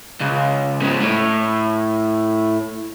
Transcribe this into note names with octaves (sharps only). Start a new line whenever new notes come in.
C#2
G#2 C#3
A2